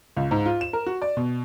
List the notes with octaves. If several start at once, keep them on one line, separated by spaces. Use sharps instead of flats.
C#2
G#2
F4
E7
A#4
F#4
D5
B2